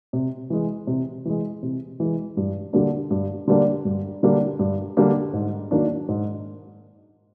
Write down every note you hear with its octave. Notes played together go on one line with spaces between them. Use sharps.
C3
E3 G#3
C3
E3 G#3
C3
E3 G#3
G2
D3 G3 A#3 D4
G2
D3 G3 A#3 D4
G2
D3 G3 A#3 D4
G2
D3 G3 A#3 D4
G#2
D#3 F#3 A#3 D4
G#2